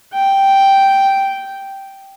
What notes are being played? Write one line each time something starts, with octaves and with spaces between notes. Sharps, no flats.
G5